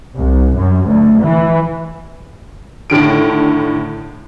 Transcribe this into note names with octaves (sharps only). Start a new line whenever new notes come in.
C2
F#2
D2
E3
A2 D3 D#3 D7